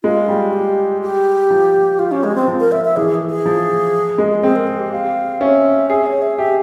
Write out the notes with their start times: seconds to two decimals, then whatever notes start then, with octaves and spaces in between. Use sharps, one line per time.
0.03 G#3 F4
0.28 G3
0.53 G4
1.02 G4
1.50 F3
1.99 F4
2.12 C#4
2.24 G#3
2.35 C4
2.48 F3
2.60 A#4
2.72 E5
2.85 E5
2.96 E3 G#4
3.29 G#4
3.46 F3
4.18 G#3
4.43 C4 G#4
4.56 A#4
4.67 G#4
4.80 G4
4.92 F5
5.41 C#4 E5
5.90 G#4 E5
6.06 C#5
6.22 E5
6.38 G4 E5